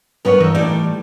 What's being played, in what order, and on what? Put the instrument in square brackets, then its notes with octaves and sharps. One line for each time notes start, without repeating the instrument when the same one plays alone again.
[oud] G2 B3 [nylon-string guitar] A#4 B4 C#5
[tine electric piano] E3 [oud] D#4 A4
[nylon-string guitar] A2 G3 D5 [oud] D#4